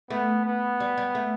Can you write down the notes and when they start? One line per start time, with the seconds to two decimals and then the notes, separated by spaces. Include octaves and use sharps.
0.10 A3 B3
0.45 B3
0.80 G3
0.97 G3
1.15 A3